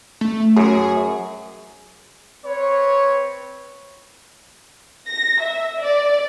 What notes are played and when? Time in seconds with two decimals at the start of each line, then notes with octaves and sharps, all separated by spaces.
0.21 A3
0.56 F#2 G#4
2.44 C4 B4 C#5
5.08 A#6
5.41 E5
5.84 D5